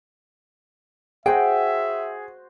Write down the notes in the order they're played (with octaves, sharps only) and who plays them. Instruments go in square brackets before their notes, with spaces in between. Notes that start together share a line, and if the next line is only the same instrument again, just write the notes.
[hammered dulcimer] F#4 C5 [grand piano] G#4 [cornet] E5 [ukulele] G5